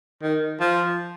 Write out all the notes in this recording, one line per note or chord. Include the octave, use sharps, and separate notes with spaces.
D#3
F3